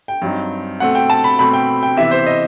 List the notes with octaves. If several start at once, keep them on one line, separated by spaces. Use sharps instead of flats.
G5
G2 F#3 C4 D#4
B2 A3 C4 F#5
G5
A5
B5
B2 A3 C4 B5
G5
G5
C3 E3 B3 E5
C5
D#5